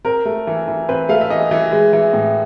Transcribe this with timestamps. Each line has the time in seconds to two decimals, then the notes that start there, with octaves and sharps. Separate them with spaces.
0.05 C4 A#4
0.25 A3
0.47 E3
0.68 E3
0.89 C4 B4
1.09 A3 F5
1.21 E5
1.30 E3 D#5
1.51 E3
1.71 G#3
1.93 E3
2.13 A2